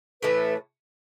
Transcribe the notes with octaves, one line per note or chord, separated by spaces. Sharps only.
A2 E3 A3 B4